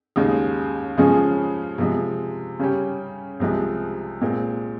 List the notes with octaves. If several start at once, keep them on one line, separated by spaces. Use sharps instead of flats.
D#2 C#3 G#3
C#3 F3 G#3 C#4 G#4
C3 F3 G#3
C#3 G3 C#4 G4
C2 C3 F3 G#3
A#2 G#3 C4